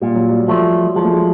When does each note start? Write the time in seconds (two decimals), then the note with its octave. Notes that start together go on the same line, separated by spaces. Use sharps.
0.01 A#2 G3
0.15 F#3
0.30 G3
0.48 F3 F#3 A3
0.95 F3 G#3
1.05 A3
1.13 G#3